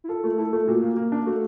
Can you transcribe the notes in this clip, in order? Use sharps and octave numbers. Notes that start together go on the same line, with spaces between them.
E4
F4 A4
A3 F4
E4 A4
A3 F4
A#2 F#4
A#3
A#3
D4
A3 F#4